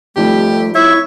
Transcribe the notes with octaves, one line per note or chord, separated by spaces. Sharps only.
G#1 F3 G3 A3 G4
E4 C#5 E5